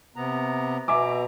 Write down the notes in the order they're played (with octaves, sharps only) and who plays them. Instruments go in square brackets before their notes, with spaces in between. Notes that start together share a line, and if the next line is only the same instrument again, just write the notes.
[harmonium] C3 B3 A#5
[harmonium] B2 A#5 [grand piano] E5 G#5 D6